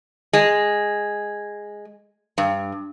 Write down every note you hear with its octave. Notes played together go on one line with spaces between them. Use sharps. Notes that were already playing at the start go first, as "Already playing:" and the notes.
G#3
G2